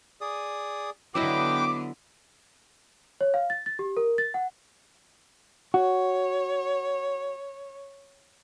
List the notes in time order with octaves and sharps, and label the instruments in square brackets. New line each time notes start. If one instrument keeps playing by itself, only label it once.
[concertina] G#4 D5 D#6
[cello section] D3 B3 [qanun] F#3 E4 D#5 [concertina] B4 G5 [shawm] D6
[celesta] C#5
F5
A6
A6
G4
A#4
A6
F#5
[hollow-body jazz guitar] F#4 [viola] C#5